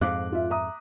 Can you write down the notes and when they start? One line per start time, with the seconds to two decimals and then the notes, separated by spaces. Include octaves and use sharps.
0.01 F2 G#2 F5 D6 F#6
0.32 F4 E5
0.50 E5 A#5 D#6